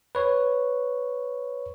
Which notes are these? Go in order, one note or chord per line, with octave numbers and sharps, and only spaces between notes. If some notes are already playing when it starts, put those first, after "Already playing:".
B4 C#5